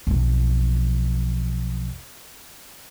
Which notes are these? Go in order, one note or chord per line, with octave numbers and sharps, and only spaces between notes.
B1 F2